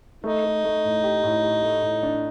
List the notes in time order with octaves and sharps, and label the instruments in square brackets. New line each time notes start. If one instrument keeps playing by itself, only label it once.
[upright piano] A3 [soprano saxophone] D#4
[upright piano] A3
A3
A2
G4
A2
G4
A3
A2
D4